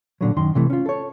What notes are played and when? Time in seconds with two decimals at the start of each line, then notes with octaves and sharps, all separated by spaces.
0.21 A#2 D3 F#3
0.37 F#2 D#3 C6
0.55 C3 E3 A3
0.70 C#4 F4
0.86 A4 C#5